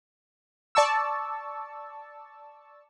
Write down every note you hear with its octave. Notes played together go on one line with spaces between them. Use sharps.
D5 A5 C#6 E6